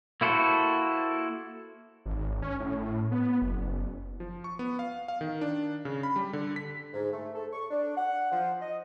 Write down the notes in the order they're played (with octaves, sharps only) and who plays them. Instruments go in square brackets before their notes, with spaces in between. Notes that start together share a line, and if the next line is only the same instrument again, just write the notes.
[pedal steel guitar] A#3 E4 F#4 A4 C5
[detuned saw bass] G#1
C#4
A2
B3
F#1
[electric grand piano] F3
C#6
B3
F5
F5
D#3
D4
C#3
B5
G3
D3
B6
[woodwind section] G#2
A3
A4
C#6
D4
F#5
F3
D#5